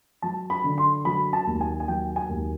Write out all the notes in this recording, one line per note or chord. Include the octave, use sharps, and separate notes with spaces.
F#3 A5
B5
D3
C6
F#3 B5
A5
D#2
G#5
G#5
F#3 G5
G#5
D#2